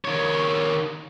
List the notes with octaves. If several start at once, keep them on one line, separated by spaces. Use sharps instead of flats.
D#3 C#5